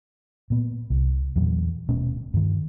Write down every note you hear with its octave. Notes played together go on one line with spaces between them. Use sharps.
A#2 B3
C2
E2 A#2 F#3
D#1 B2 A3 C#4
G2 D#3